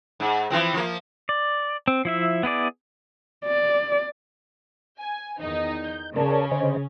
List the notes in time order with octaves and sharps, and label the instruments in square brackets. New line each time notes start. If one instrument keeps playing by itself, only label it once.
[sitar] G#2
E3 F3 C4
F3 A#3
[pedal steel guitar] D5
C4
F3 E4 E5
B3 E4 G#4 D5
[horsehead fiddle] D5
[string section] G#5
E2 D#3 D#4
[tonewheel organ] G6
[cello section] C#3 [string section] C#4 [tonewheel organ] A#4 D5 A5
[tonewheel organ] D3 C5 D#5